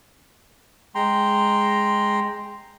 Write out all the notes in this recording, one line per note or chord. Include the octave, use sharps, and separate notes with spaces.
G#3 G5 A#5 C6